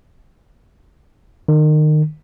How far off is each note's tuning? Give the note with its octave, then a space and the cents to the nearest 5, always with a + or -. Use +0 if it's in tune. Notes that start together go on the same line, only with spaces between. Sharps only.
D#3 -30